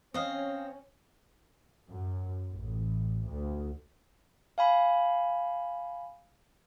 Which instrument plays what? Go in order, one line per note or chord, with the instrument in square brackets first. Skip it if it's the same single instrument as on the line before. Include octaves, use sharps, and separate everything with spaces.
[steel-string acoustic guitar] C4 [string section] C#4 [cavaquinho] D#5 F5
[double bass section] F#2
A1
D2
[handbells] F5 G#5 B5